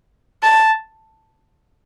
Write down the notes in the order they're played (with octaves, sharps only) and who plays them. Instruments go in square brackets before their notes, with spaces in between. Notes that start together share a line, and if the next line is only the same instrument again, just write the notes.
[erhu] A5